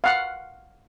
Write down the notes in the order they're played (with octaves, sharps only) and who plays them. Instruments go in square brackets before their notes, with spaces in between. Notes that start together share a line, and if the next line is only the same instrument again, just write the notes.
[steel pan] F5 F#5